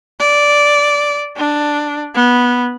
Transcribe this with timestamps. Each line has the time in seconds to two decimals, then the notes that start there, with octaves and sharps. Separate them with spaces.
0.19 D5
1.37 D4
2.15 B3